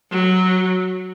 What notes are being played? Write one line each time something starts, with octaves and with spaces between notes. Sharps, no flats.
F#3